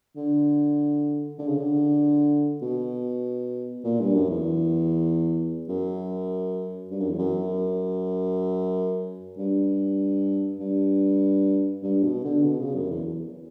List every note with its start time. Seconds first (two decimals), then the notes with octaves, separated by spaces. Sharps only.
0.16 D3
1.38 D3
1.48 C#3
1.58 D3
2.62 B2
3.84 A#2
4.00 G2
4.15 F#2
4.30 E2
5.68 F#2
6.91 G2
7.01 F#2
7.10 E2
7.18 F#2
9.38 G2
10.60 G2
11.83 G2
12.03 B2
12.24 D3
12.44 B2
12.59 C#3
12.75 F#2
12.90 E2